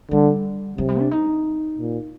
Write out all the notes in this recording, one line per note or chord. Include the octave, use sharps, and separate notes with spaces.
D3 G3
C3 F#3
G3
D4
D#4
A#2